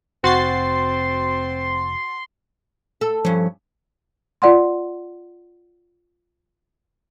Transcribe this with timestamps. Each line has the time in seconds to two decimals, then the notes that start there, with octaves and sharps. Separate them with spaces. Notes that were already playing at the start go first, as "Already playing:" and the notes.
0.24 F1 C4 F#4 C6 A6 C7
3.01 A4
3.25 G2 F3 C#4
4.42 F4 D5 F#5 C6